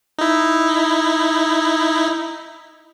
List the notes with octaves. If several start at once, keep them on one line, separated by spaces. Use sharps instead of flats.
D#4 E4